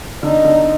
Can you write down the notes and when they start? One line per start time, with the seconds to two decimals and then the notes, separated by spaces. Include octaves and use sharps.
0.23 D3 D#4
0.45 D3